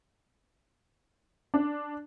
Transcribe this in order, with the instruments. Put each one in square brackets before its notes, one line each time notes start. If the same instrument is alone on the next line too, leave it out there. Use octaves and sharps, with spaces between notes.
[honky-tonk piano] D4